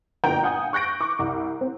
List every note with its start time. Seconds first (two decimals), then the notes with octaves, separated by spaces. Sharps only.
0.24 G1 A#2 A#3 G5 A#5 G6
0.43 F5 F#5 G#5 D#6 G6
0.73 C#6 F#6 G6 A#6 D7
1.01 C#6 D6
1.19 C2
1.61 C4